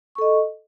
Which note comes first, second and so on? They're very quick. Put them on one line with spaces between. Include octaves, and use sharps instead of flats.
C#6 A4 D#5